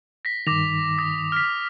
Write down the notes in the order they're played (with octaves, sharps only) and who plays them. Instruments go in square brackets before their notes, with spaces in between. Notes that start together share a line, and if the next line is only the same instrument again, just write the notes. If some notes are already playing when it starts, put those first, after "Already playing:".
[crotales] A#6 B6
[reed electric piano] G2 D#3 [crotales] D6 A#6 F7
[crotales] D#6 A#6
F6 B6